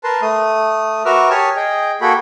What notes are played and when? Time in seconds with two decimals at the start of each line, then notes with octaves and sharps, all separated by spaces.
0.04 A#4 B4 A5 C6
0.22 A3 D#6
1.05 F#4 A#4 B4 E5 D6 F6
1.30 G4 C#5 G#5 A5 D#6 F6
1.56 G#4 D#5 G5
2.01 A#3 F#4 G#4 A4 G5 B5